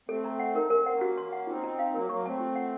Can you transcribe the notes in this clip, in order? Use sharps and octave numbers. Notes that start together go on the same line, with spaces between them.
A3 C4 A4
A#5
F#5
D#4 A#4
C#4 A#4
C4
F#5
A#3 C#4
F#4
C6
F#5
C4 D#4 F4
A#5
F5
F#3 A#3 A#4
F#3 A#3 C#6
A3 C4 A5
F4
F#5